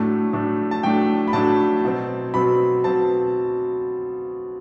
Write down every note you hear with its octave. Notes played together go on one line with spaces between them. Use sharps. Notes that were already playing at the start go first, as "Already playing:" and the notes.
Already playing: A2 F#3 A3 D4 A5
A2 F#3 A3 D4
A5
A2 F#3 A3 D4 G5
B5
A2 F#3 A3 D4 A5
B2 F#3 C4
B2 F#3 C4 B5
B2 F#3 C4 A5